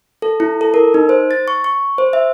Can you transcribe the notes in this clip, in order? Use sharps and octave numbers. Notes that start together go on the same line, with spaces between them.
A4
E4
A4
A#4
D#4
C5
A6
C#6
C#6
C5
E5